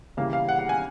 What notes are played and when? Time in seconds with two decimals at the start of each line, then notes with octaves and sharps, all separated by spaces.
0.17 C#3 E3 G3 A#3 F5
0.33 F5
0.49 F#5
0.59 F#5
0.69 G#5